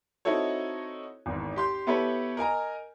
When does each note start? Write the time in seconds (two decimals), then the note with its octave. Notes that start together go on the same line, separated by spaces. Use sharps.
0.25 C4 D#4 E4 F#4 A4 C#5
1.26 G#1 E2 G#2
1.56 G4 C6 G6
1.87 B3 E4 G4 A4 B4 C#5
2.37 A#4 D#5 G#5 A#5